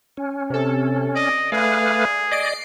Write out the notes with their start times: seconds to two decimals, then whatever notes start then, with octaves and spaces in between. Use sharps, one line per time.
0.17 C#4
0.50 C3 A4
1.15 D5 D#5
1.52 A3 G#4 B4 F5
2.32 D5 D#5 C7 D7